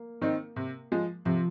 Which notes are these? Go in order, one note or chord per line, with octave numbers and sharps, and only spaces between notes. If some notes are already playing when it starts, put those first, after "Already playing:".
Already playing: A#3
D#3 C4 D#4
C3
F3 G#3
C3 F3